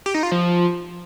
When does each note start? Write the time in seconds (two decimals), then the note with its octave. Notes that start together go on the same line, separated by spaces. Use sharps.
0.06 G4
0.14 D#4
0.23 F4
0.32 F3